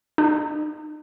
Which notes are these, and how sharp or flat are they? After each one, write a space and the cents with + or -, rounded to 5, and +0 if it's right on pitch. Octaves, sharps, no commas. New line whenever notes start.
D#4 -35